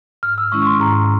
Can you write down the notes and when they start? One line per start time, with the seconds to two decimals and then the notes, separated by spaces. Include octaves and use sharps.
0.23 G#2 F6
0.38 E6
0.52 D#3 G#3 C#4 E4 C#6
0.62 C#6
0.66 C6
0.80 G#2 A#5